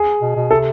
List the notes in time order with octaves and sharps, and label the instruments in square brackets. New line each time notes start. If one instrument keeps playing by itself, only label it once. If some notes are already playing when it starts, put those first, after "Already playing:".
Already playing: [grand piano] G#4
[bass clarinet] B2
B2
[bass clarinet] C3 [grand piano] A4